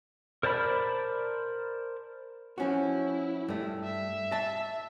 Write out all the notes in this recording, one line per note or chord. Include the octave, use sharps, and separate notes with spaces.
A#4 C5 D5 A5 B5
F3 C#4 E4 F#4
G2 A3
E5
D#5 A5